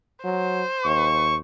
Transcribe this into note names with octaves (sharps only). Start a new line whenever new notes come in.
F#3 C5
D#2 C#6